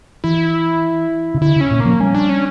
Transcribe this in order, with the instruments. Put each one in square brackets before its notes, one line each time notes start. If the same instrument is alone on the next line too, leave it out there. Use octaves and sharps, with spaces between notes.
[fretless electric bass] E3 [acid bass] E4
[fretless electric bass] C#3
[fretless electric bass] D3 [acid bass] E4
[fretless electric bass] C#3 [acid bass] C#4
[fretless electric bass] A#2
[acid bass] A#3
[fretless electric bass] F3
[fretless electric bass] G3 [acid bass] C#4
[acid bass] D4
C#4